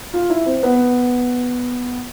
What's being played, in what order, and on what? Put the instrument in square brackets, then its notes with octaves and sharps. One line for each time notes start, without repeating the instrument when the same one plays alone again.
[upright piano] F4
E4
C4
B3